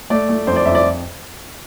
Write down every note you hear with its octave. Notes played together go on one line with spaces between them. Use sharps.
A3 D5
A3
F2 C5
D5
F2 E5
D5